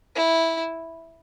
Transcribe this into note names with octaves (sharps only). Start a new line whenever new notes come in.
E4